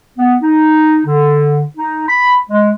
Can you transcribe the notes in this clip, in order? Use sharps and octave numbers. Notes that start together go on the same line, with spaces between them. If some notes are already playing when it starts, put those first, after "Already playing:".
B3
D#4
D3
D#4
B5
G#3